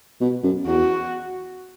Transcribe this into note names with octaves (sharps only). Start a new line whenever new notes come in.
B2
F#2
E2 F#4